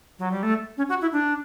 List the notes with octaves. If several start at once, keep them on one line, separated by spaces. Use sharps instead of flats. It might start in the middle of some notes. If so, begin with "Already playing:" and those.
F#3
G3
A3
C#4
F#4
E4
D4